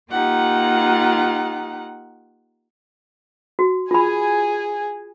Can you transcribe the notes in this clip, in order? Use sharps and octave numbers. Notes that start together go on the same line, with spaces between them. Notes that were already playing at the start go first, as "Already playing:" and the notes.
A#3 D#4 F4 G4 F#5
F#4
F4 G#4 G#5 B5